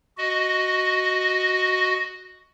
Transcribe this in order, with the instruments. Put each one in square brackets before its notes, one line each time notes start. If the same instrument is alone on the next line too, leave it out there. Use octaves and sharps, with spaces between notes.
[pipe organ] F#4 D#5